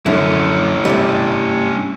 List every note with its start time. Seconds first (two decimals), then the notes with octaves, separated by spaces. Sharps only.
0.06 F#2 D3 C#4 E4
0.85 G2 C3 G3